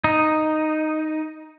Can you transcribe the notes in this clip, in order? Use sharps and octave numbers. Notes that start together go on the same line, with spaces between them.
D#4